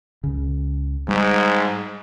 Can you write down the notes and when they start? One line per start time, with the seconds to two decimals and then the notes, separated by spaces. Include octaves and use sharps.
0.24 C#2 C#3
1.08 G#2 G3